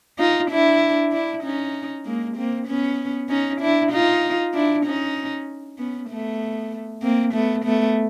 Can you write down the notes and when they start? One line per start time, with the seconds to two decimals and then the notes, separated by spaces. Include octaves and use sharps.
0.19 D#4 F4
0.50 D4 E4
1.12 D4 E4
1.43 C#4 D#4
2.05 G#3 A#3
2.36 A#3 C4
2.67 B3 C#4
3.29 C#4 D#4
3.61 D4 E4
3.91 D#4 F4
4.54 D4 E4
4.85 C#4 D#4
5.78 B3 C#4
6.10 A3 B3
7.02 A#3 C4
7.34 A3 B3
7.65 A3 B3